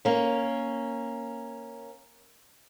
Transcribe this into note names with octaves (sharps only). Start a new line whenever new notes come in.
A#3 C#4